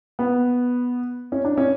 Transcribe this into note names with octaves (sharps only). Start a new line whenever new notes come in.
B3
C#4
D4
C#4